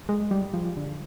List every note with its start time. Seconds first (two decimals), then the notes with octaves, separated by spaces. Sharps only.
0.09 G#3
0.31 G3
0.54 F3
0.77 D3